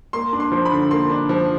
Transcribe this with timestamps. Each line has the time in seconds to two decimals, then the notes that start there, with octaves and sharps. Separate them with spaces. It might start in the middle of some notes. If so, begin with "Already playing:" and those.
0.13 A#3 C6
0.33 D4
0.40 C6
0.52 F3 C6
0.65 B5
0.72 D3
0.91 A#3 C6
1.10 D4
1.29 F3